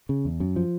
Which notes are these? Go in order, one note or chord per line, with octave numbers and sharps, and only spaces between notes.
C#3
E2
F#2
F3